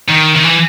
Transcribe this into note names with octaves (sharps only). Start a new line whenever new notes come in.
D#3
D#3
E3